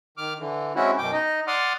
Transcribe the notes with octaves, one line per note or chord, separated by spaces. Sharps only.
D#3 D6 F6
D3 E3
G#3 C4 C#4 E4 F#4
F#2 B2 G5 D6
D#4 D#5
D5 F#5 C6 D6 D#6 F6